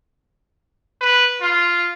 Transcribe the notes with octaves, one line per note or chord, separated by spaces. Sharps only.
B4
F4